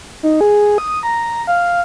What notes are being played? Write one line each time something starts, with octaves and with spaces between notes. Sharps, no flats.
D#4
G#4
D#6
A#5
F5